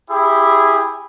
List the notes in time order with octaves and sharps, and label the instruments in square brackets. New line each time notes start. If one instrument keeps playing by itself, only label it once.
[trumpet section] E4 G4 G#4